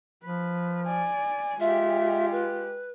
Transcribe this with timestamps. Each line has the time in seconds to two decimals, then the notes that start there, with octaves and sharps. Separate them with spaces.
0.24 F3 B4
0.87 D5 G#5
1.60 G#3 F4 G4 E5
2.31 B4